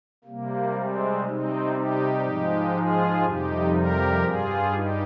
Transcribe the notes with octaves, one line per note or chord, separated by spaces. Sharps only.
C3 G3 A#3
G#3 C4
C3 G3 C4 D#4
D#4 G4
G#2 F3 G#3
F4 G#4
F2 C3 G3 D#4 G4
G4 A#4
G2 G3 F4 G#4
D#4 G4